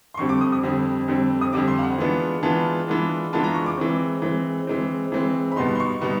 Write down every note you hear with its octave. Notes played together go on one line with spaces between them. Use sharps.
C6
F2 D3 G3 C4 C#6
D6
D#6
D#6
F2 D3 G3 C4
F2 D3 G3 C4
D#6
F2 D3 G3 C4 D6
C6
F5
F#5
E3 G#3 B3 D4 F4
E3 G#3 B3 D4 F4 A5
E3 G#3 B3 D4 F4
E3 G#3 B3 D4 F4 A5
A#5
C#6
D6
E3 G#3 C4
E3 G#3 C4
E3 G#3 C4
E3 G#3 C4
B5
B2 G3 B3 D#4 C6
C6
C#6
B2 G3 B3 D#4